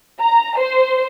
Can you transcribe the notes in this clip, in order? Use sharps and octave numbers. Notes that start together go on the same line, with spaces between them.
A#5
C5